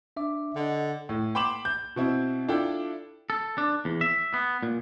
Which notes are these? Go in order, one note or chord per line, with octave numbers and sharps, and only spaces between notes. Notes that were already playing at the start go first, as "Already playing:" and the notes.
D4 E5 D6
D3 D#5 F#5
A2
G5 B5 C6 D6 E7 F#7
G6
B2 C4 E4
D4 E4 F4 A4 G5
A4
D4
E2
E5
B3
A#2